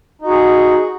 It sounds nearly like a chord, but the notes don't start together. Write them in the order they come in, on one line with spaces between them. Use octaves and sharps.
D#4 F#4 G#4